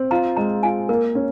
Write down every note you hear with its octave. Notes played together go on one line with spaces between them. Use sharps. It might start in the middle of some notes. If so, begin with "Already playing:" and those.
Already playing: C4
F4 A#5
G#3 A#5
F4 G#5
A#3 A#4
C#4